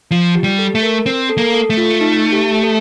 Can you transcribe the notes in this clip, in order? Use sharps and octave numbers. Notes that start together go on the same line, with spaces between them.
F3 F4
G4
G3
A4
A3
A#4
C4
A4
A#3
A4
A3
F4
D#4
G4
A4